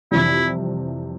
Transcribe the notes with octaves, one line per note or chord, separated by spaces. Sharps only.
F2 C3 E3 G3 E4